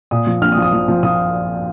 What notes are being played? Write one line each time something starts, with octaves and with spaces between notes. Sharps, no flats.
A#2 D#6
F3
A#1 F6
D#6
F3
D#6
F3
F3
F3 D#6